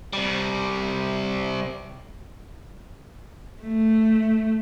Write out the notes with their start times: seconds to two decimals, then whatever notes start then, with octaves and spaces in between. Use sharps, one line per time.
0.13 C3 G3
3.62 A3